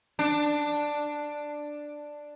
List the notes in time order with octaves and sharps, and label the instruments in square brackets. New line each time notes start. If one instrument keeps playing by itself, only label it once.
[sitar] D4